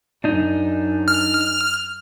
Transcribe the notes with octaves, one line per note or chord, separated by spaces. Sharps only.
F#2 D4 D#4
F6